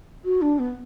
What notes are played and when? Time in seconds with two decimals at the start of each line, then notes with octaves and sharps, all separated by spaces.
0.25 F#4
0.42 D4
0.59 B3